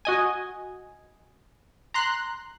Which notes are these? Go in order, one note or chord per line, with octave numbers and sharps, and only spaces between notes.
F#4 D#5 G#5
A#5 C6 F#6